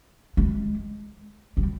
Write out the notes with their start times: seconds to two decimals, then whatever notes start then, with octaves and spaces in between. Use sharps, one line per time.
0.37 G#3
1.57 G3